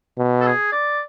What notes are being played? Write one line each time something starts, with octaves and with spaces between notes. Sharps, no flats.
B2
A4
G#4
D5